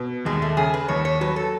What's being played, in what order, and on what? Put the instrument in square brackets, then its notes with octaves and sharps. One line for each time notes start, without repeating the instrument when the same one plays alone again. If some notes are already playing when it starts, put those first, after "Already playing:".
Already playing: [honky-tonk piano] B2
[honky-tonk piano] D#2 [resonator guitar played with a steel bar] G#3
[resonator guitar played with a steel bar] A3
[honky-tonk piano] C#3 [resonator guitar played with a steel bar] G#4
[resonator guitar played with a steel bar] B4
[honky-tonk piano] D#2 [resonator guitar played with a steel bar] C#5
[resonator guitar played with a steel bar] C#5
[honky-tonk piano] F#3 [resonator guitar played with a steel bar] B4
[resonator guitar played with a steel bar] A4